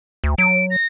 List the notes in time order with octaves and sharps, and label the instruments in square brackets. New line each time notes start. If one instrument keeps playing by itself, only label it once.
[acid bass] D2
[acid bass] F#3 [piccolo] D7
[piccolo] A#6